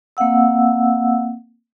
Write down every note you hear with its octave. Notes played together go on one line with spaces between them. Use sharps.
A#3 C4 F5 F#5 E6